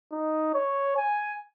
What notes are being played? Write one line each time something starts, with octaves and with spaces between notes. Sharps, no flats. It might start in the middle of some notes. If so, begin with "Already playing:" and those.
D#4
C#5
G#5